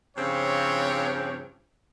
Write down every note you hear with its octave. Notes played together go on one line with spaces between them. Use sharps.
G2 C#3 F3 C4 G4 C#5